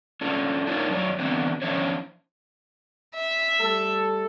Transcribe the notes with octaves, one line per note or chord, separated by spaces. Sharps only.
C#4 D4 F4 A4
D4 D#4 F4 A#4 C#5
F#2 F#3 B3 C#5 D5
D3 E3 A3 B3 C4 D4
F3 C#4 D4 E4 C5 C#5
E5
G3 A3 A4